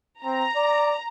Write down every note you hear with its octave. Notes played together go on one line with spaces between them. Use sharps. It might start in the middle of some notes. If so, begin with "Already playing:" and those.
C4 A#5
D5